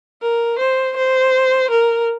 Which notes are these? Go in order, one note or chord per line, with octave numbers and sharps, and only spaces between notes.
A#4
C5
C5
A#4